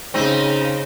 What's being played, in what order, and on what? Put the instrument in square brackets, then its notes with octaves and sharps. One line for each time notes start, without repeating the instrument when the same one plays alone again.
[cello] C#3 [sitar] C4 D#4